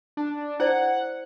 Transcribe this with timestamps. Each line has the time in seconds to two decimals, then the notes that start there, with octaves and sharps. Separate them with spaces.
0.17 D4
0.60 E4 C5 D5 F#5